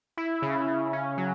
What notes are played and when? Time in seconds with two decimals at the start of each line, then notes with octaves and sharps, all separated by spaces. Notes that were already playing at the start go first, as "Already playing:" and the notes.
0.17 E4
0.42 C#3
0.68 C#3
0.93 C#4
1.18 F#3